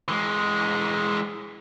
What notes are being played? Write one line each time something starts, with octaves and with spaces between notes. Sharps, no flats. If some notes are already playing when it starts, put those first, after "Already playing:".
E3 G#3